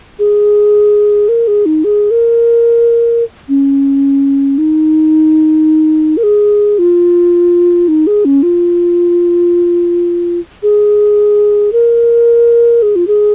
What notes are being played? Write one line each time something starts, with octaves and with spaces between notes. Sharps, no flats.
G#4
A#4
G#4
D#4
G#4
A#4
C#4
D#4
A#4
G#4
F4
D#4
G#4
C#4
F4
G#4
A#4
G#4
F4
G#4